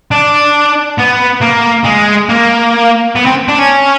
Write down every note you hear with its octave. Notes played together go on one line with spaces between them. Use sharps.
D4
B3
A#3
G#3
A#3
B3
C4
D4
C#4